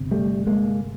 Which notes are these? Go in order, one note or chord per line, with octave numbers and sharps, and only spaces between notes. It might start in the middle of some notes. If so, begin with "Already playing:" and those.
Already playing: G1 C3
G3 A3
G#3 A#3